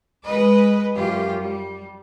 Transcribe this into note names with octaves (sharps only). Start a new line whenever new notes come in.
G#3 B4 D#5
F#2 F4 G4
G3